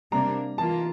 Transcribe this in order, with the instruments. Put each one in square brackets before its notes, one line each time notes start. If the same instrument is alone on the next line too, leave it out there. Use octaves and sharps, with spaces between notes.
[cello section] C3 G3 A#3 D4 [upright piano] A#5
[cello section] E3 A#3 F4 [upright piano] A5